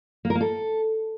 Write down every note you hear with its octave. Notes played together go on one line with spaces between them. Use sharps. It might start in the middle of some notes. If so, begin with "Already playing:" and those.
A#3
A#4
A#3
A4